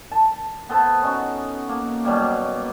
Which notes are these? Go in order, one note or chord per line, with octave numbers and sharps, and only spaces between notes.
A5
B3 A4 C5
C#4 D#4 F#4
A#3
B2 F#3 G3 A#3